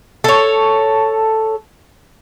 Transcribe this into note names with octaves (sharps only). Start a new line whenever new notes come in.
A4 C#5